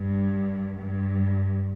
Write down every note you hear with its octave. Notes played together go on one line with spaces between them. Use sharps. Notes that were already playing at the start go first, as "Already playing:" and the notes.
Already playing: G2
G2